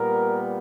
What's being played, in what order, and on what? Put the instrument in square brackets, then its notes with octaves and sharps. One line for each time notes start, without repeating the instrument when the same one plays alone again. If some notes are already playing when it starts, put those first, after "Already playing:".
Already playing: [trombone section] A#2 G3 B3 A#4